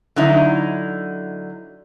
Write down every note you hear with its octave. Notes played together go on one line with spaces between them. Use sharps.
D3 F#3 D#4 E4